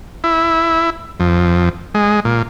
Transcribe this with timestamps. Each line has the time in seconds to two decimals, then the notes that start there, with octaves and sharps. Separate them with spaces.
0.24 E4
1.20 F2
1.95 G#3
2.25 A#2